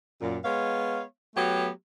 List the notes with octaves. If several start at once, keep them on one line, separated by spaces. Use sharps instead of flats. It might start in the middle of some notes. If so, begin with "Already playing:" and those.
F#2 A#2
G#3 B3 C#5 F5
F#3 A3 B3 F#4 G4